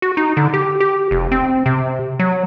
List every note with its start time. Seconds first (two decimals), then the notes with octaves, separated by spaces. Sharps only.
0.02 F#4
0.17 D#4
0.37 D3
0.54 G4
0.80 G4
1.11 F1
1.32 C4
1.66 C3
2.19 F#3